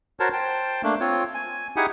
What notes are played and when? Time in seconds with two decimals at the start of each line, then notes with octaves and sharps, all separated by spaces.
0.20 F#4 A#4 C5 C#5 A5
0.33 C5 G5 A5
0.83 A3 A#3 D4
1.00 C4 F4 C#5
1.34 G#5
1.76 D#4 E4 G4 G#4 F#5 G#5